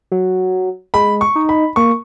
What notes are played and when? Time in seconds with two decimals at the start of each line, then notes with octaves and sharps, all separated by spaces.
0.12 F#3
0.94 G#3 B5
1.21 C#6
1.35 D#4
1.49 B5
1.76 A#3 C#6